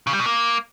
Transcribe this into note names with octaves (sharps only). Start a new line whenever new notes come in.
C#3
G3
B2
A#3